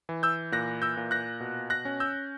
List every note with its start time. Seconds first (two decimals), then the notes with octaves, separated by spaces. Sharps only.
0.09 E3
0.23 E6 G6
0.52 A#2 F#6 A#6
0.82 E6 G6
0.97 A#2
1.11 F#6 A#6
1.40 B2
1.70 F#6 A#6
1.85 C#4
2.00 E6 G6